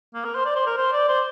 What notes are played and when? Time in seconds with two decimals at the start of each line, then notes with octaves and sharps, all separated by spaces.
0.14 A#3
0.25 A#4
0.35 C5
0.45 D5
0.56 C5
0.67 A#4
0.78 C5
0.93 D5
1.09 C5